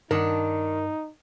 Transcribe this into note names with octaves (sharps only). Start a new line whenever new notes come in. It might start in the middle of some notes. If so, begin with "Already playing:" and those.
G2 D#3 D4 D#4 A#4 F#5